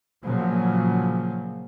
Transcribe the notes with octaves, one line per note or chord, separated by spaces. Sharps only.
A#2 C#3 F3 F#3